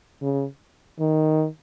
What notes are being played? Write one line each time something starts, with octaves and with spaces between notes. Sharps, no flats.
C#3
D#3